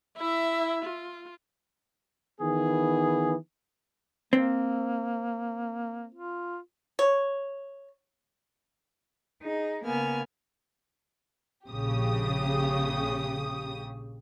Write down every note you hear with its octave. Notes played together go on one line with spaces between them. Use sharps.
E4 E5
F4
D#3 E3 B3 G#4
A#3 C4
F4
C#5
D#4 G#4
C#3 A#3 B3 G#5 F6
A#1 C#3 G4 D#6